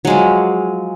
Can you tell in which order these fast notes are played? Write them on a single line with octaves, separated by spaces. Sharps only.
F#3 G#3 F3